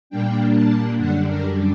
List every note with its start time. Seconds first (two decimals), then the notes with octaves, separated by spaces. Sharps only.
0.10 A#2 G3 A#3 D4 G5
0.54 A5
0.97 F#2 D3 G3 D4 F#5
1.27 A#4